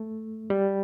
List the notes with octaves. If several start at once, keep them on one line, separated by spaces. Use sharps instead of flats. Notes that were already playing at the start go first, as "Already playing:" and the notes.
Already playing: A3
G3